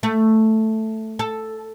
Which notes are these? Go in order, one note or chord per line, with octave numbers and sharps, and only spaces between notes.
A3
A4